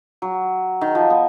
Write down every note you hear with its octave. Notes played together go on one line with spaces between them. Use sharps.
F#3
D#3
F3
B3